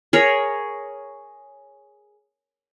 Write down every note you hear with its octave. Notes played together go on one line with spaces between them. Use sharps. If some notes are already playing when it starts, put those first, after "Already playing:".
G#4 A#4 C#5